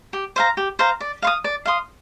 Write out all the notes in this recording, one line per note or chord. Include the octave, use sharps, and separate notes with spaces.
G4
C5 F5 A#5
G4
C5 F5 A#5
D5
F5 C6 D#6
D5
F5 C6 D#6